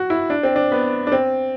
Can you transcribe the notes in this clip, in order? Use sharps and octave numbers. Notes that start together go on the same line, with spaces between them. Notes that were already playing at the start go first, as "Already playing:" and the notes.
Already playing: F#4
E4
D4
C4
D4
B3
D4
C4